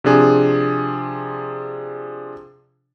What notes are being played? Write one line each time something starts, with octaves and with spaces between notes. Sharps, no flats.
C3 F3 D4 G#4